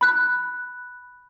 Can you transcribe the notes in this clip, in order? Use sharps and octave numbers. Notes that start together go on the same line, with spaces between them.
B5 F#6